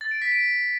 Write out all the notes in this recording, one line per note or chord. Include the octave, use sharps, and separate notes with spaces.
A6
D7
B6
D7